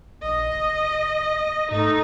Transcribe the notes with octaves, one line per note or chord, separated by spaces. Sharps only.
A#1 D#5
F#1
G#2 A3 D#4